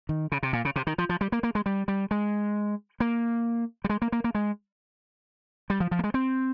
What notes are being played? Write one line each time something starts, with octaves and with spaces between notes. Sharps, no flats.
D#3
C#3
C3
A#2
C#3
C3
D#3
F3
F3
G3
A#3
A#3
G#3
G3
G3
G#3
A#3
G3
G#3
A#3
A#3
A#3
G#3
G3
F3
F3
A#3
G#3
C4